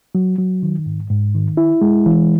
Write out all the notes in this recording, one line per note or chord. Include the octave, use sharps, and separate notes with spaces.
F#3
F#3
D#3
G#2
G#2
D#3
E4
G#3
E3